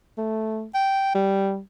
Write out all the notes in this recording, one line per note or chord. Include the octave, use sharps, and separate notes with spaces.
A3
G5
G3